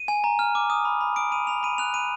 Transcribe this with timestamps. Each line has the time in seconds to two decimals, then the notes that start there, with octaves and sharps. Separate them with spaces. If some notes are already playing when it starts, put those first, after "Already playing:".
Already playing: D#7
0.08 G#5
0.24 A#5
0.39 F6
0.55 D6
0.70 D#6
0.85 B5
1.01 B5
1.16 D#6 D7
1.32 B5 D#7
1.47 B5 F7
1.63 B5 D#7
1.78 F#6 F7
1.94 B5 D#7